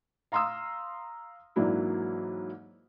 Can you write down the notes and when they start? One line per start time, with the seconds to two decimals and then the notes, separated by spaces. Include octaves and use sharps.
0.32 F5 A#5 C6 D#6 E6
1.56 G#2 E3 F#3 A#3 D4 E4